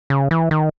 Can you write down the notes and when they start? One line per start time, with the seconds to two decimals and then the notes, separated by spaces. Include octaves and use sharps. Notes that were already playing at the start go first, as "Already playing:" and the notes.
0.10 C#3
0.31 E3
0.51 D#3